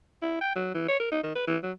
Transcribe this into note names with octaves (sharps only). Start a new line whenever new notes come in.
E4
G5
F#3
E3
C#5
A#4
D#4
D#3
B4
E3
F#3